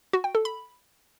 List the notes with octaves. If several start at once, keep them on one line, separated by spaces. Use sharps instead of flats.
F#4
G5
A4
B5